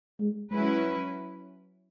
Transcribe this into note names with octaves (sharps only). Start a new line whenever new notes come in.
G#3
F#3 G#3 C#4 E4 B4